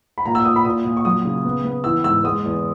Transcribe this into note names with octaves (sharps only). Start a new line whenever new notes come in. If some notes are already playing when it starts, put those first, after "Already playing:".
B5
A#2 A#5
E6
A#2 D#6
B5
A#2 D#6
A#2
C#6
F#3 D#6
C#3
B3
B3
E3 E6
G#2 E6
G#3 D#6
E2